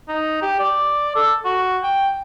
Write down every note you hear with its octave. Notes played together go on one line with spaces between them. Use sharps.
D#4
G4
D5
A4
F#4
G5